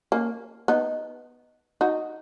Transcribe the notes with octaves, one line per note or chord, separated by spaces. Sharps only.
A#3 C#4
B3 D#4
D#4 F#4